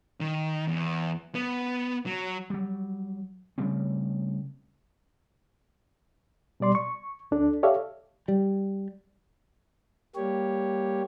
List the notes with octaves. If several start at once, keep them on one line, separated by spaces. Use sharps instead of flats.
D#3
E2
B3
F#3
F#3 G3
C#3 G3 A3 C4
B2 G3 D5 C6
C#6
D2 D4 A4
G4 A4 C#5 D5 E5 F5
G3
G3 A#3 G4 C#5